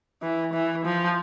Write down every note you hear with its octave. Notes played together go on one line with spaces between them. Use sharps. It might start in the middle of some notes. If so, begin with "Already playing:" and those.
E3
E3
F3